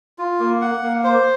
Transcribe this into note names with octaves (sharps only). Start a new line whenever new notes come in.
F4
A#3
F#5
A#3
C5